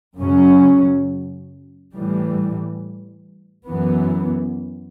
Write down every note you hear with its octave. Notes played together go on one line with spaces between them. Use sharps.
F#2 C#3 F#3 C#4
A2 E3 G3
F#2 E3 B3